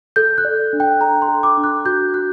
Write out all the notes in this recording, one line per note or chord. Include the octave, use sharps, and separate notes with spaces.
A4 G6
F#6
D5
D4
G5
A4 A#5
C6
A4
D6
D4
F#6
F#4 G6
F#4 F#6